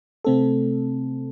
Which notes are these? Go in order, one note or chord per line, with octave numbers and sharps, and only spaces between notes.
C3 A3 C4 A4